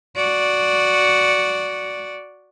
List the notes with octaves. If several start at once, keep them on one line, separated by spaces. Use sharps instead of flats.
F#4 D5